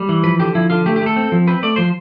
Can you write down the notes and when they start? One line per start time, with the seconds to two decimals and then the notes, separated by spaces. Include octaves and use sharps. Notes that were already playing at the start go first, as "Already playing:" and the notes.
Already playing: G3
0.09 E3
0.24 F3 B4
0.39 D3 G4
0.55 F3 E4
0.70 D3 F4
0.86 A3 G4
0.96 G4
1.01 A3 A4
1.16 C4
1.32 F3
1.47 C4 B4
1.63 A3 D5
1.76 F3 C5